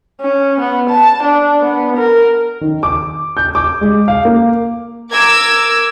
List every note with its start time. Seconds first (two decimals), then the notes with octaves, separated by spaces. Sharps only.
0.21 C#4
0.60 B3
0.90 A5
1.24 D4
1.62 B3
1.97 A#4
2.61 D#3
2.83 D6
3.37 G6
3.55 D6
3.81 G#3
4.08 F5
4.25 A#3
5.11 A#4 D6 E6 G#6